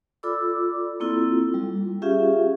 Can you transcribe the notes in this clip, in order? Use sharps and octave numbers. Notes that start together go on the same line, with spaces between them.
F4 A4 D5 B5 D6 E6
A#3 C4 E4 F4 A4
G3 F4
C#4 F4 G4 G#4 E5 F5